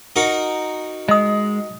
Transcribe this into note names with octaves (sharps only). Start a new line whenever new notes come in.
D#4 F#4 A#4
G#3 D#5 D#6